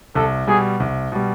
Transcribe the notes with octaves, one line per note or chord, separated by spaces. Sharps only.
C2 A4
B2 G3 G#4
C2
B2 G3